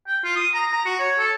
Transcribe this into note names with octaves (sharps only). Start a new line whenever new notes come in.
G5
F4
D#6
A#5
A#5
F#4
C#5
A4